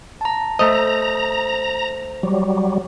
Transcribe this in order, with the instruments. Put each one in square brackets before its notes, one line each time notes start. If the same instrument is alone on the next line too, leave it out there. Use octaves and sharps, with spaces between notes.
[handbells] A5 A#5
[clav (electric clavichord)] A3 D#5 [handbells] C5 [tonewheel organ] A#5
[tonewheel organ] F#3 G3